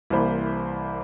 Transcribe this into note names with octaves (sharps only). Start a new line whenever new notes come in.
C2 E3 A#3 C5 B5